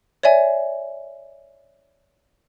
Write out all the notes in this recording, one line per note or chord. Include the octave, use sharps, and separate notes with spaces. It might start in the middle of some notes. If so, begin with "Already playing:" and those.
C#5 D5 E5 G#5